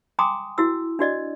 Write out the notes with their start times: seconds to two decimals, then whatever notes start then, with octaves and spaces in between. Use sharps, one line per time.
0.19 G5 G#5 A#5 C6 D6 D#6
0.58 E4 F#4 E6
0.99 D4 F#4 D5 D#5